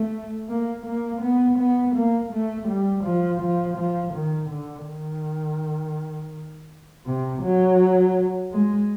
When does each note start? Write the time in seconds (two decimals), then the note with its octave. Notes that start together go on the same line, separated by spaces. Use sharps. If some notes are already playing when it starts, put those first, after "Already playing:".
Already playing: A3
0.49 A#3
0.86 A#3
1.22 B3
1.59 B3
1.95 A#3
2.32 A3
2.68 G3
3.05 F3
3.41 F3
3.77 F3
4.14 D#3
4.50 D3
4.86 D#3
7.06 C3
7.43 F#3
8.52 G#3